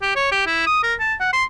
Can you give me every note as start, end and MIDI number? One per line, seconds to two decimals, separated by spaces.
0.02 0.11 67
0.16 0.29 73
0.32 0.43 67
0.46 0.63 64
0.67 0.80 87
0.83 0.94 70
1.00 1.14 81
1.20 1.29 78
1.33 1.44 84